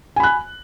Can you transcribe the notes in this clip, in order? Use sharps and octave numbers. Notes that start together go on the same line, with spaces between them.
G#5 B5 F#6